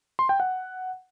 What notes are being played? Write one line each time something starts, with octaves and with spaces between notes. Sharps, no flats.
C6
G5
F#5